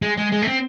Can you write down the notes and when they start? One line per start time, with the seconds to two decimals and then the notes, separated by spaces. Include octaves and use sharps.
0.02 G#3
0.17 G#3
0.32 G#3
0.42 A3
0.47 C4